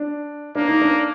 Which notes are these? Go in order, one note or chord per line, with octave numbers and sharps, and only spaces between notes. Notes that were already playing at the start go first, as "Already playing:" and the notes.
Already playing: D4
A#3 D4
D#4
D4